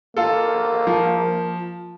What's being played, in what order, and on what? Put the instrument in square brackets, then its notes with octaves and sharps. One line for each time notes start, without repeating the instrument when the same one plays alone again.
[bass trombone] A#3 [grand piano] F4 A4
[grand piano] F3